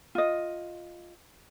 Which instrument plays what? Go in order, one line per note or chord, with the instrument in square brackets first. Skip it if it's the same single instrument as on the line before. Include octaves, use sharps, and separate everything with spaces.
[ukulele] F4 D#5